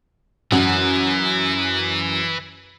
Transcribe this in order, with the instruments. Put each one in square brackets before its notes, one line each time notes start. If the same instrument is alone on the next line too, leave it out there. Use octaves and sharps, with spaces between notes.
[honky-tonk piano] F#2 F#5 F#7 [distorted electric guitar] E3